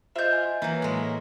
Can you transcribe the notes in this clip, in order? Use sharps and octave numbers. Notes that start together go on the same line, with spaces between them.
F4 C5 D#5 E5 G6
G#5
E3 F#3 A#3
A2 G#3